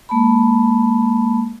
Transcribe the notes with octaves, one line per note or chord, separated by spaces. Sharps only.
G#3 A#3 A5 B5